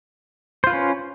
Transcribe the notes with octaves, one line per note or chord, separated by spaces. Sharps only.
C#4 F4 B4 C5